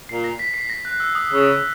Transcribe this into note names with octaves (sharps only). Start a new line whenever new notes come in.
A#2 C7
A#6
B6
C7
A#6
F#6
E6
D#6
C#3 E6